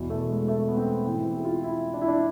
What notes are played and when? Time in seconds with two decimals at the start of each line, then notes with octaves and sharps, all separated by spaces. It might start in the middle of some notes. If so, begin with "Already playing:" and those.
Already playing: E2 B2
0.10 A3
0.29 G#3
0.48 A3
0.68 B3
0.77 C4
1.06 G#2 E3 C4
1.25 E4
1.37 G#4
1.45 F4
1.63 E4
1.94 D4
2.01 E4
2.08 D4